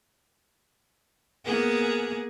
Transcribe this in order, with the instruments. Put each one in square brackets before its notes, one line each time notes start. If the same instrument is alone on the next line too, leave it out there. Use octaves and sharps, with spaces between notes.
[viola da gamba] A#3 B3 G#4